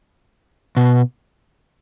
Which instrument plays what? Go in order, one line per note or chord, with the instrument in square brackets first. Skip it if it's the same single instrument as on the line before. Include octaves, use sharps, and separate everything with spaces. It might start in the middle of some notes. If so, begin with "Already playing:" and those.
[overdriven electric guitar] B2